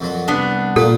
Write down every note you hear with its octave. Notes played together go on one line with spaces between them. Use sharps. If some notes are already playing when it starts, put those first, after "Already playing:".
F2 A#2 F#3
C2 B3 D4
A#2 A#3 F4 A4